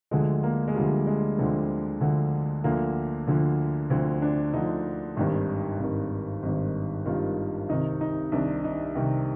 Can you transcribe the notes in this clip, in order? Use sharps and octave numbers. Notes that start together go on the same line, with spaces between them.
D2 D3 F3 G#3
A#3
G#3
D2 D3 F3 G3
G#3
D2 D3 F3 C4
D2 D3 F3
D2 D3 F3 A#3
D2 D3 F3
D2 D3 F3 C4
D4
D2 D3 F3 D#4
G#1 G2 D#3
G#1 G2 D#3
G#1 G2 D#3
G#1 G2 D#3 F4
C2 C3 D#3 D#4
D#4
C2 C3 D#3 D4
D#4
C2 C3 D#3 G4